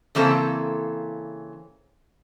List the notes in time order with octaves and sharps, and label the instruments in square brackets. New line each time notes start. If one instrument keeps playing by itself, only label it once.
[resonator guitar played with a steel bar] C#3 E3 A#3 C4 A4